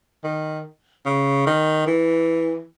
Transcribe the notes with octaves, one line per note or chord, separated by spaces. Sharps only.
D#3
C#3
D#3
E3